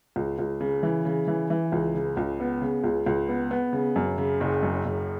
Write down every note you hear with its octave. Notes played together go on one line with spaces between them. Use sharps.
C#2
C#2
C#3
E3
C#3
E3
E3
C#2
C#3
C#2
B3
C#3
C#2
C#2
B3
B3
C#3
F#2
C#3
F#1
F#2
F#1